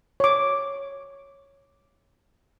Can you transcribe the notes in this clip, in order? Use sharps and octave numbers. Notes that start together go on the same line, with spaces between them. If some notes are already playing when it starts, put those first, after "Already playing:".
C#5 D6